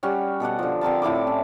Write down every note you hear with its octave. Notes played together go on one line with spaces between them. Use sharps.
G3 C#4 F#4
B2 A4 D5 F#5
D3 F3
D3 C4 A#4 A5
A2 E4 A4 D6
C#4